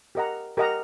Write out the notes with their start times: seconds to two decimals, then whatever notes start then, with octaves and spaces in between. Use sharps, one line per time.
0.15 G4 A#4 D#5 F#5 A#5
0.57 G4 A#4 D#5 F#5 A#5